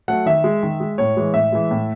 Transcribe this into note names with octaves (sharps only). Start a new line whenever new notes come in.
F#3 A3 F#5
D#3 E5
G#3
D#3
G#3
A2 C#5
E3 G#3
A2 E5
E3 G#3
A2